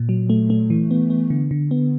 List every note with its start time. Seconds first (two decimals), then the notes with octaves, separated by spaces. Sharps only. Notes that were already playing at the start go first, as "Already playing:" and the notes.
Already playing: A#2
0.09 F#3
0.30 A3
0.50 A3
0.70 E3
0.91 B3
1.10 B3
1.30 D3
1.51 D3
1.71 B3